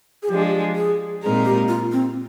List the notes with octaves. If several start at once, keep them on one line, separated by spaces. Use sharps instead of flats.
G#4
F3 G#3 D4 G4
G#4
A#2 G#3 C4 D#4 G#4 A#4
G4
F4
C4